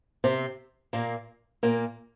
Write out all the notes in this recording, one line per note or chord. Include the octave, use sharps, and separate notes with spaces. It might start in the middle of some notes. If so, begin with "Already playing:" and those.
C3 C4
A#2 A#3
A#2 A#3